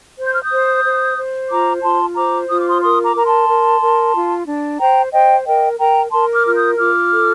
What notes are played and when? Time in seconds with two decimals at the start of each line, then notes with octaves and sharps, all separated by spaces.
0.18 C5
0.27 G6
0.34 F6
0.43 D#6 G6
0.51 C5
0.84 C5
1.17 C5
1.50 F4 A#5 D6
1.83 F4 A5 C6
2.16 C5 A#5 D6
2.49 F4 D#6
2.60 D6
2.69 C6 D#6
2.82 A#4 C6 D#6
3.04 A#5 D6
3.15 A#4 A#5
3.26 A5 C6
3.48 A#4
3.81 A#4
4.14 F4
4.47 D4
4.80 C5 G5 A#5
5.13 C5 D#5 G5
5.46 A#4 D#5 G5
5.79 A#4 G5 A#5
6.12 A#4 A5 C6
6.34 D6 F6
6.45 F4 F6
6.56 D#6 G6
6.78 F4 D6 F6
7.11 A4